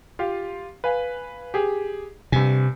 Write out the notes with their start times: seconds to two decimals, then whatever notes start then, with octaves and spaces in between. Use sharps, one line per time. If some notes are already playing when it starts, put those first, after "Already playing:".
0.19 F4 G4 F5
0.84 B4 F5 G#5
1.54 G4 G#4
2.32 G2 C3 G#5